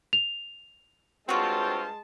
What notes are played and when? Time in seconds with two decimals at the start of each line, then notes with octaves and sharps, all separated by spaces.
0.13 F7
1.29 G2 G#3 C4 F4 F#4 C#5 A5